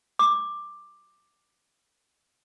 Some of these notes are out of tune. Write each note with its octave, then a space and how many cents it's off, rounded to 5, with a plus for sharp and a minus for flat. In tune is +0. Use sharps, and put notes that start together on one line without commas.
D6 +10